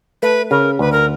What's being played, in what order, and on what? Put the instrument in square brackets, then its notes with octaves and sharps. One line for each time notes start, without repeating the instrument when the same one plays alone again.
[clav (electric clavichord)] A3 [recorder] B4
[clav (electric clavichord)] C#3 [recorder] A#4
[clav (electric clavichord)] D2 [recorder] B4
[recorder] A#4